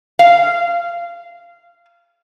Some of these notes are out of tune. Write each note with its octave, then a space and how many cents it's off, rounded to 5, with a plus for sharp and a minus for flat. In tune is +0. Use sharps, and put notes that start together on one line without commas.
F5 -20